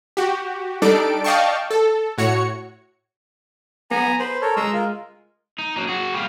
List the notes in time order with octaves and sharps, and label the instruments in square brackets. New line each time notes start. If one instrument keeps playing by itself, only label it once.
[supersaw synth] F#4 G4
G3 D4 D#4 A4 D5 D7
D5 D#5 F5 G5 A5 C#6
A4
A2 F#4 C#5 C#7
[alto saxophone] B3 [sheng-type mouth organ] G#5 A#5
[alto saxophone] B4 [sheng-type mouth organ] C5
[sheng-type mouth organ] A4 A#4 C#5
[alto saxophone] G#3 [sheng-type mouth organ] A#5 C6 E6
[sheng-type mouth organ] F4 A#4
[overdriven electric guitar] D#4
F#3 A#3
F#4 G#4
G3 F4